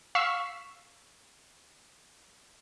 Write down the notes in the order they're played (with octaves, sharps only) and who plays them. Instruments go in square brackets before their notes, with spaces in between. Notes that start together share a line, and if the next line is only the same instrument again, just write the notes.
[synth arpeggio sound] F5 C#6 E6 B6 C7 E7